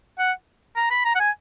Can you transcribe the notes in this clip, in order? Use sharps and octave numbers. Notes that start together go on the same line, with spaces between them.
F#5
A#5
B5
A#5
F#5
G#5